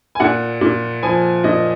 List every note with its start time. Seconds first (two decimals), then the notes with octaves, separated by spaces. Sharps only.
0.15 G#5
0.20 A#2 F#5
0.61 A#2
1.03 F3 G#5
1.44 A#2 D#5